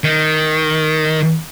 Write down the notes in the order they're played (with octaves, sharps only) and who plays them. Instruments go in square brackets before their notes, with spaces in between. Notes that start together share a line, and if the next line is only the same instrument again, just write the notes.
[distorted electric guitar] D#3